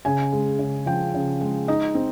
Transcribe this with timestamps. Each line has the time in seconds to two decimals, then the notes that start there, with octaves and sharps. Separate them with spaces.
0.05 C#3 G#5
0.32 G#3
0.59 C#3
0.86 F3 G5
1.14 C#3
1.41 G#3
1.68 D#4 D#5
1.95 C4